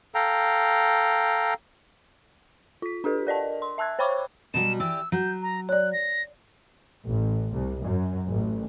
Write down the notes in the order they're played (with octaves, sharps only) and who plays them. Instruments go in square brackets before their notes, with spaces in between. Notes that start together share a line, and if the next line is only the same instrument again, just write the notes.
[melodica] A4 F5 G5 A#5
[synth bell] F4 B6
D4 G4 A4 B4
A#4 D5 D#5 A5
C6
E5 A5 E6 F#6 G#6
C5 C#5 G5 B5 C#6 D6
[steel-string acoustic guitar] B2 F#3 G3 [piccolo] E7
[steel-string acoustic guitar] E3 G4 D5 [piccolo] E6
[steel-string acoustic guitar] F#3 [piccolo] G6
[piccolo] A#5
[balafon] C#5 D5 [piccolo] F#6
[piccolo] A#6
[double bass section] A1
C2
F#2
A1